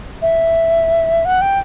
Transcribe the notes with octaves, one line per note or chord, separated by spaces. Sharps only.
E5
F#5
G5